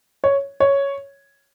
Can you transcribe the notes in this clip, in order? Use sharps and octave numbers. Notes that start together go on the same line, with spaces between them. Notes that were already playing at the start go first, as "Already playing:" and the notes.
C#5
C#5